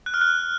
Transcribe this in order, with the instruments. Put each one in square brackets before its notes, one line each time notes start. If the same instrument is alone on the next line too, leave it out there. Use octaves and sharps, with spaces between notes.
[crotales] F#6
F6
F#6